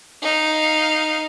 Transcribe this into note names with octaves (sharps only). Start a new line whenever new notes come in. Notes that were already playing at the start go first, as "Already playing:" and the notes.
D#4 F5